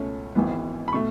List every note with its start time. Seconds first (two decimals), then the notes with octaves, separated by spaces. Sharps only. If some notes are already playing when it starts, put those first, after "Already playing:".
Already playing: C#2 B2 A3 C#4
0.35 G#1 G#2 E3 B3
0.88 B5
0.93 B2 A3 C#6